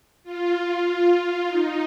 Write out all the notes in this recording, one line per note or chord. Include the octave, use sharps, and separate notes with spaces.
F4
D#4